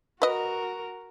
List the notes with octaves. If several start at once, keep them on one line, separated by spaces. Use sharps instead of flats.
F#4 A#4 B4 D#5